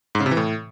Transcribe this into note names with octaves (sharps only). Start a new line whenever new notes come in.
G#2
C#3
C3
E3
A2